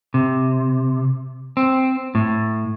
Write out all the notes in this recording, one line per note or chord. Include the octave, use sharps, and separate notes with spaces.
C3
C4
A2